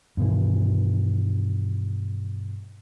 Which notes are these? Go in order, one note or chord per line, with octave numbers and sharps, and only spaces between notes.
G2 B2 D#3 E3